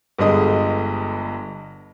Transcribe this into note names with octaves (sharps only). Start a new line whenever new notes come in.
G1 G2 D3 G#3 D#5 D#6